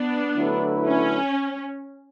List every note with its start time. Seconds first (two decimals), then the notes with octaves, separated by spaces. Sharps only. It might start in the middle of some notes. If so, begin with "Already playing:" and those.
Already playing: B3 D4
0.34 D3 F#3 A3 E4 B4
0.86 C#4